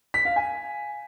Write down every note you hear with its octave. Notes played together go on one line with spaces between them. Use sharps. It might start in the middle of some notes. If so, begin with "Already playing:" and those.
B6
F5
G#5